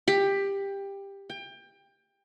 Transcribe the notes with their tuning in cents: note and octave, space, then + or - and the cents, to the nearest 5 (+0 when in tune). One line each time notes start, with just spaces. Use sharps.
G4 +15
G5 +25